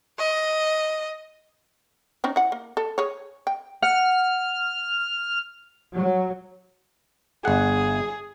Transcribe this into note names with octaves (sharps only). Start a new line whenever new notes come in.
D#5
C4 C#4 D#4
E3 F#5
A#3
A4
G#4 C#5
G5
F#5 F6
F#3
G1 G#4 F#5